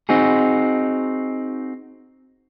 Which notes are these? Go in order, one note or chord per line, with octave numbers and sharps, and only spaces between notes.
C4 D#4 F#4 G#4